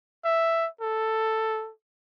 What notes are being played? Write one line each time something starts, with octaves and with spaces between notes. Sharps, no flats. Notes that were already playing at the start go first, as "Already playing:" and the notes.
E5
A4